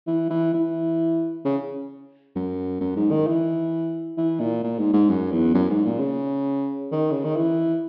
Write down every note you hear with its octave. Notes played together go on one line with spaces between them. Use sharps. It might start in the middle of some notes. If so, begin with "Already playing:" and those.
E3
E3
E3
C#3
F#2
F#2
G#2
D#3
E3
E3
A#2
A#2
G#2
G#2
F#2
E2
F#2
G#2
A#2
C#3
D#3
C#3
D#3
E3